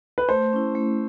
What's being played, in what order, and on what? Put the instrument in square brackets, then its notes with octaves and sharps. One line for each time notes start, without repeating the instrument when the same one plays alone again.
[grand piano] B4
[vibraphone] A3 [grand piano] C5
[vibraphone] C#4 E4
A3